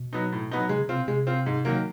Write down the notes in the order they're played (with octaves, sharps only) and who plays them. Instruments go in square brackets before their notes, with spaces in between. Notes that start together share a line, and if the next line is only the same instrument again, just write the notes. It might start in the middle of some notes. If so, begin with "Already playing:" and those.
Already playing: [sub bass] B2
[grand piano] F#3 B3 D#4
A2
F#3 B3 D#4
[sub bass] C3 [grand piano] G#3
[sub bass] C#3
[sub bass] C3 [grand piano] C4 F4
[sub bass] B2
[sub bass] C3 [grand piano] G#3
[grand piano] C4 F4
G#2
D#3 F#3 A#3